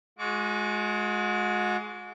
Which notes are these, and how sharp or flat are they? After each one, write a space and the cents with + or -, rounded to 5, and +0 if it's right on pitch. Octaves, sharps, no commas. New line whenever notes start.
G#3 +20 F#4 -35 D6 -40